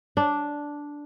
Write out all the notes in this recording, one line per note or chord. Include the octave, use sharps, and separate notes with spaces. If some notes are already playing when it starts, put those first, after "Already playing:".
D4